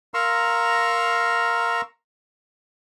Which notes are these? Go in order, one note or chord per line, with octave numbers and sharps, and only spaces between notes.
A#4 F5 A#5 C6 C#6 E6